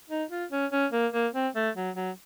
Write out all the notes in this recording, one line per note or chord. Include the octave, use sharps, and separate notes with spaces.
D#4
F4
C#4
C#4
A#3
A#3
C4
A3
F#3
F#3